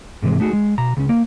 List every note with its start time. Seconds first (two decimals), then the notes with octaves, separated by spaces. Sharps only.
0.22 G#2 C3 E3 G#3
0.40 A3 D#4 F#4 G#4
0.53 G#3
0.78 B2 A#5
0.97 C#2 C#4
1.09 A#3